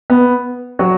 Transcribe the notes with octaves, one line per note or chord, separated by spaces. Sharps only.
B3
F#3 F#4